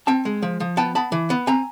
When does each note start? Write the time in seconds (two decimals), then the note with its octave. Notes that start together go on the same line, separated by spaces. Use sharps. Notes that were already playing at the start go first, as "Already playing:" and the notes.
0.07 C4 G5 A5
0.25 G#3
0.42 F3
0.60 F3
0.77 B3 G5 A5
0.95 B3 A5 B5
1.12 E3
1.30 B3
1.47 C4 G#5 A#5